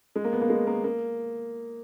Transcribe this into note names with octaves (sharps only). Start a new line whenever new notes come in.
G#3
A#3
B3
A#3
G#3
A#3
A#3